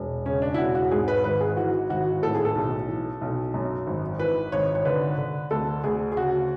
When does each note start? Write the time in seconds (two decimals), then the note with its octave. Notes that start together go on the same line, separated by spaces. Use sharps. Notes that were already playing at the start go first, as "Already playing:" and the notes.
Already playing: E1
0.26 C#3 C#4
0.42 D4
0.54 E4
0.58 E1 F#4
0.75 F#4
0.91 G#2 G#4
1.08 B4
1.24 G#1 B4
1.41 G#4
1.57 E3 F#4
1.90 G#1 F#4
2.23 A2 A4
2.35 G#4
2.45 A4
2.55 B1
2.88 E3
3.21 B1
3.54 F#2
3.87 G#1
4.19 E3 B4
4.52 G#1 C#5
4.75 C#5
4.85 D3 B4
5.18 D3
5.51 D2 A4
5.84 D2 G#4
6.12 G#4
6.17 C#3 F#4